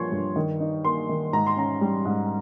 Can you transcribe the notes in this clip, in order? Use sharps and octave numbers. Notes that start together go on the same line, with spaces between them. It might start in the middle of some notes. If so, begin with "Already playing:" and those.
Already playing: G2 F3 A#3 C#5 C6 C#6
G2
D#3
D#4
A#3 C6
D#3
G#2 A#5
C6
C#4 A#5
G3
G#2